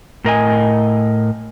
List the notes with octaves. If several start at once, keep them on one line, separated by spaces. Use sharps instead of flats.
A2 A#4 D#5 G#5